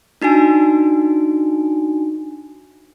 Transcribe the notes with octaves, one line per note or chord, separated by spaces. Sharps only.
D4 D#4 F#4 G#5